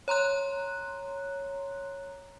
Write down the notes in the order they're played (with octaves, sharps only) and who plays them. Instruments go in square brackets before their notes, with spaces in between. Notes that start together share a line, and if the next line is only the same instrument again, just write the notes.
[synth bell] C#5 A#5 C6 F#6